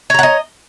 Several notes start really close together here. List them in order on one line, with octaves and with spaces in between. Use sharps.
C#5 A#5 F#5 D#5